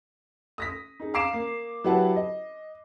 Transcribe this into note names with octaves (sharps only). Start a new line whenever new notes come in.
D#6 A#6 B6
D#4 G#4
F5 A#5 D6 C7 D7 E7
A#3
F#3 E4 G4 B4 F#5 A5
D#5